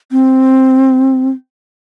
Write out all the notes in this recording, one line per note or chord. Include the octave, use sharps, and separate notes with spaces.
C4